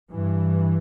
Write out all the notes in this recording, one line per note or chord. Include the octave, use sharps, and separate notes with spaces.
G2 E3